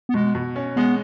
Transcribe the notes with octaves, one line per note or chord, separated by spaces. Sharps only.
B3
B2 G#3
B2
C#4
G#3 B3